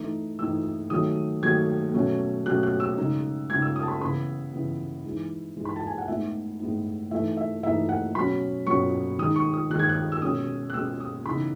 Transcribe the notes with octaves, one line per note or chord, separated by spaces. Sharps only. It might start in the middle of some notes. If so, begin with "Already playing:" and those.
Already playing: E3 A3 D#4
E3 A3 D#4 E6
D#3 F#3 A3 D#6
D#3 F#3 A3 G#6
B2 F#3 A3 C#4
B2 F#3 A3 C#4 F#6
F#6
E6
C#3 G#3 D#4
C#3 G#3 D#4 G#6
E6
D#6
A5
B5
C#3 E3 B3 B5
C#3 E3 B3
E3 G#3 D#4
E3 G#3 D#4
B5
A5
G#5
F#5
A2 G#3 B3 D#4 E5
A2 G#3 B3 D#4
E3 A3 D#4 E5
E5
E3 A3 D#4 E5
F#5
B2 F#3 C#4 B5
B2 F#3 C#4 C#6
D#3 G#3 D#4 D#6
C#6
D#6
D#3 G#3 D#4 F#6
G#6
F#6
E6
B2 G#3 C#4 D#6
F#6
B2 G#3 C#4 E6
D#6
C#3 E3 B3 D#4 B5